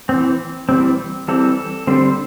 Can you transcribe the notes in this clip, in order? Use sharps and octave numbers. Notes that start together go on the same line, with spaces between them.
E3 C4
E3 G3 C4
E3 G3 C4 A4
D3 G3 C4 C5